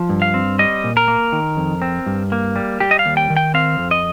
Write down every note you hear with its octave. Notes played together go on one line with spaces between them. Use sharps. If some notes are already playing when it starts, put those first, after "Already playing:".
Already playing: F3
G2
F5
C4
G3 D#5
A#2
A#4
A#3
D#3
F2
C4
G2
A#3
G3
G3 G4
D#5
F5
D#2
G5
D#3
G5
C4 F5
F2
D#5